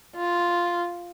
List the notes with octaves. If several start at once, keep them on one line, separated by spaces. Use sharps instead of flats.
F4